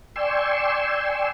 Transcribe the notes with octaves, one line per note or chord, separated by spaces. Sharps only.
D5 G5 G#5 C6 C#6 E6